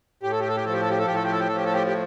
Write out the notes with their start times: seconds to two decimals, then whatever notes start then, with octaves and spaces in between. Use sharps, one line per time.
0.23 A2 G4
0.31 A4
0.40 G4
0.48 A4
0.57 G4
0.65 F3 A4
0.73 G4
0.81 A4
0.90 G4
0.98 A4
1.07 A2 G4
1.15 A4
1.23 G4
1.32 A4
1.40 G4
1.48 A4
1.51 F3 G4
1.65 A4
1.73 G4
1.87 G4